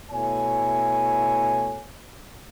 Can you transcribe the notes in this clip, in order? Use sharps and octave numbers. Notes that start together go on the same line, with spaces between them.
B2 A3 E4 C#5 G#5